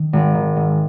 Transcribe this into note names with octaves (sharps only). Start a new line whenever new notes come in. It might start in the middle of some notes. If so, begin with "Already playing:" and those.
Already playing: D#3
G#1
D#3
G#2